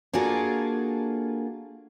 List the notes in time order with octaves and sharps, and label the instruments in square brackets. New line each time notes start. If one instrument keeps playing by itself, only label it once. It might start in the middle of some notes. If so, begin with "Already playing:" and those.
[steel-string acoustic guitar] A#3 D4 F4 F#4 G#4 A4